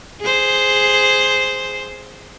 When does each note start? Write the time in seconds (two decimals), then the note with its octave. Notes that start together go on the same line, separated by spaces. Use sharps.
0.21 G#4 C5